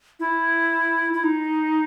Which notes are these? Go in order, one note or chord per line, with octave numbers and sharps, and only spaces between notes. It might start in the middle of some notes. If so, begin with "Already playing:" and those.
E4
E4
D#4